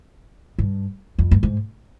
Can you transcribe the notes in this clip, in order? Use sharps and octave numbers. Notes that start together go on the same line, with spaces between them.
G2
F2
G2
G#2